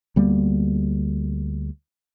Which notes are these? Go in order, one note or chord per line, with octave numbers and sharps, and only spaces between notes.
D2 G3 A#3 B3